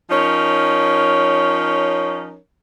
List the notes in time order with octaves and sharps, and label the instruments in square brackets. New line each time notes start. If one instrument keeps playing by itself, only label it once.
[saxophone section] F3 C#4 D#4 A#4 C#5